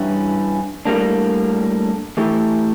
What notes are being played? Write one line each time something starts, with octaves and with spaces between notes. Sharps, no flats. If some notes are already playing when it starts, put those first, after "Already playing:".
Already playing: G2 E3 G3 C#4 E4
A2 G3 A#3 D4
E3 A3 E4 G4